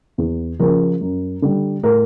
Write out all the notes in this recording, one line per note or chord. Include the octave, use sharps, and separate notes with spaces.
E2
C#3 F3 A#4
F#2
D3 G3
A2 A#4